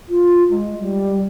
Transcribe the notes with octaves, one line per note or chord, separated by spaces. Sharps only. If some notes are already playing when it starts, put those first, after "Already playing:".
F4
G#3
G3